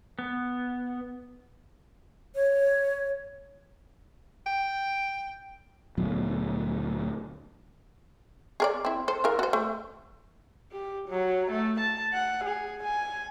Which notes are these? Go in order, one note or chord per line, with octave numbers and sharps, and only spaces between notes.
B3
C#5
G5
D2 A#2 F#3 B3
G#4 A#4 D5
C4 E4
A4 C5
E3 A#4 F5
F#4 C5
A3
G4
F#3
A3
A5
F#5
G#4
G#5